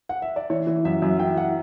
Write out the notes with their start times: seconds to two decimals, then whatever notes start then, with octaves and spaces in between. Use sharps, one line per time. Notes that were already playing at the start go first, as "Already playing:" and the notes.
0.09 F#5
0.22 E5
0.36 D5
0.50 E3 C#5
0.67 E3
0.85 F#2 E5
1.02 F#2
1.19 E3 G5
1.37 E3 F#5